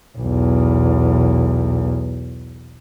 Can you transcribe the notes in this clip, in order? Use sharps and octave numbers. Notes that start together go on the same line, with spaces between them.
B1 E2